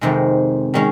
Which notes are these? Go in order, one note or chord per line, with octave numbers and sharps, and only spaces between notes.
F2 C3 D#3 G#3
D#3 G#3 C#4